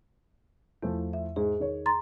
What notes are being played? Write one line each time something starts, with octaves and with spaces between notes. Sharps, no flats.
E2 F3 A3 E4
E5
G#2 G#4
D#3 C#5
A#5 C6 A6